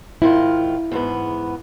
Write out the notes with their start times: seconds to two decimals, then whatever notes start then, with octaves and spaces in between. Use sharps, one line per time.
0.22 G#2 D#3 E4 F4
0.91 E2 G#2 B3